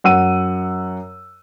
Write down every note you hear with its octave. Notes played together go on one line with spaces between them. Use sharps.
F#2 F#5 E6 D#7